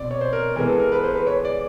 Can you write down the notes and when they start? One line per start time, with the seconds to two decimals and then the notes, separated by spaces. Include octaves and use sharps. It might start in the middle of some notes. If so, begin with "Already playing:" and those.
Already playing: B2 C4 D5
0.11 C#5
0.21 C5
0.33 A#4
0.56 E3 G#3 B3 A#4
0.68 A4
0.80 A#4
0.92 B4
1.04 C5
1.15 B4
1.27 C#5
1.45 D5